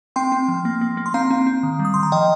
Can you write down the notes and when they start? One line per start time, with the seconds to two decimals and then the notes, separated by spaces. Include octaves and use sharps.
0.16 C4 G5 C6
0.32 C4
0.48 F3
0.65 A#3
0.81 A#3
0.97 A#3
1.06 C6
1.14 C4 F5 A#5
1.31 C4
1.47 C4
1.63 D#3
1.79 G3
1.85 D#6
1.94 D#3 C6
2.03 A#5
2.12 F3 D#5 G5